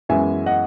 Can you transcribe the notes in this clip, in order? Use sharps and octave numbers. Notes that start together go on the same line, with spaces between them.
F#2 E3 G#3 B3 E5 G#5
D#5 F#5